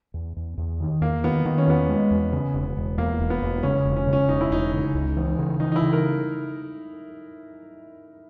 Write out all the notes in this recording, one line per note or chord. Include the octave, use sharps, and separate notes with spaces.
E2
E2
E2
D#3
E2 A#3
D#3 B3
D#3 B3
C#4
E2 B3
G#3
E2
C#3
E1
E1
E2 A#3
E1
B3
E1
C#3 C#4
E1
C#4
C#3
C#4
E1 D#4
E4
E1 D#4
C#3
C#2
E3
C#3
E3 D#4
D#4
E4
C#3
A#4